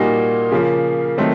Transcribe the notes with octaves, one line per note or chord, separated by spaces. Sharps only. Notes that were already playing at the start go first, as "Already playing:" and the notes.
Already playing: A#2 G3 A#3 D#4 F#4
C#3 F3 A#3
D#3 F#3 A3 C4